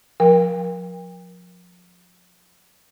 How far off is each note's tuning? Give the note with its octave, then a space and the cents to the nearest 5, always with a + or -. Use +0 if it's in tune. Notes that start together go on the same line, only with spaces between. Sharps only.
F3 +40 A#4 +25 G5 +40